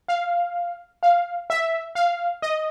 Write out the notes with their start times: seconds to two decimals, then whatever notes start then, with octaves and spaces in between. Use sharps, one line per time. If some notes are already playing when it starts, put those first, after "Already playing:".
0.08 F5
1.03 F5
1.50 E5
1.95 F5
2.42 D#5